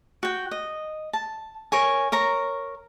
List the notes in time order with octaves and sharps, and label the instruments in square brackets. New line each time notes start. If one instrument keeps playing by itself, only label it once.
[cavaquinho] F#4 G5
D#5
A5
A#4 C#5 G#5
A#4 C#5 A#5